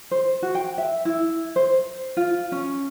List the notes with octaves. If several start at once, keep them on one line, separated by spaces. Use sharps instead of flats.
C5
F#4
G5
E5
E4
C5
F4
C#4